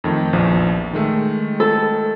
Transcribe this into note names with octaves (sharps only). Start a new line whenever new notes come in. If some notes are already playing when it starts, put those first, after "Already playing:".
F2 D#3 A3
A#1 E2 F3
D#3 G#3 A3
A4